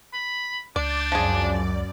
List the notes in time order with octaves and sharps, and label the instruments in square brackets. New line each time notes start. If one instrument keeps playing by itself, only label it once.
[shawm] B5
[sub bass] C#2 [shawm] D4 [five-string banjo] D5 [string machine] G6 A6
[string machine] F#2 D5 [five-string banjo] F3 G#4